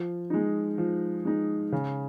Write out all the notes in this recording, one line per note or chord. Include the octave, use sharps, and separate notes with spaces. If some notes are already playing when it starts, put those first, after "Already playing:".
Already playing: F3
G#3 D#4
F3
G#3 D#4
C#3